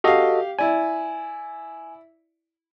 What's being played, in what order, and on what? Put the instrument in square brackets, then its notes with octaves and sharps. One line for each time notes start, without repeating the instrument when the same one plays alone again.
[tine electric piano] F#4 A4 D#5 [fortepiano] G4 F5
[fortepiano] E4 D5 [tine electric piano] G#5